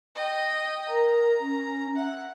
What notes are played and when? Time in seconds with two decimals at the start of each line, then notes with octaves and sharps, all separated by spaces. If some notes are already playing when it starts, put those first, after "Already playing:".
0.15 D#5 G5
0.88 A#4 A#5
1.40 C#4
1.96 E5 F#5